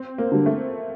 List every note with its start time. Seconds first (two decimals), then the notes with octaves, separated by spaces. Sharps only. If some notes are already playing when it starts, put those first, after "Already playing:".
Already playing: C4
0.18 A#3
0.32 D3 G3
0.46 A3